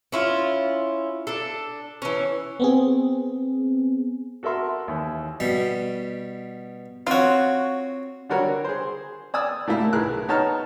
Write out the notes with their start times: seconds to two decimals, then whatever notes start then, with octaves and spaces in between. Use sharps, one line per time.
0.12 C#4 E4 F4
1.27 D4 A4
2.02 E3 C#4
2.60 B3 C4 G#4
4.43 F#4 A4 A#4 E5 C6
4.88 D#2 E3
5.40 B2 G3
7.07 C4 F4 F#4 C#5
8.30 D3 G3 F#4 A#4 C#5
8.64 G#4 C5
9.34 D5 G#5 D#6 E6
9.67 A2 A3 A#3 E4
9.93 B1 G#4 A#4 F#6
10.28 B3 D#4 C#5 A5 A#5 F6